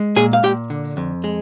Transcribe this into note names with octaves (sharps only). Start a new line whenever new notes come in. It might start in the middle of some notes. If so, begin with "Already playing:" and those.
Already playing: G#3
A#2 G#4 G#5
F5
A#2 G4 G5
D3
F2
G#3